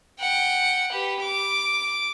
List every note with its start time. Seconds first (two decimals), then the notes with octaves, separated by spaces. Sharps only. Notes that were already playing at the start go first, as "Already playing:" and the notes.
0.20 F#5 G5
0.91 G4 B4
1.21 D6